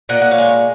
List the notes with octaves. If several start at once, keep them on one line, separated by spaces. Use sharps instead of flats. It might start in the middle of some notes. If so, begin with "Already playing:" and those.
A#2 D#5 F#5
F#5
C#5 F5
G#3